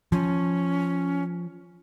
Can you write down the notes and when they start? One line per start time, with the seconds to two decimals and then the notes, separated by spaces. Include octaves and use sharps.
0.12 F3 C#4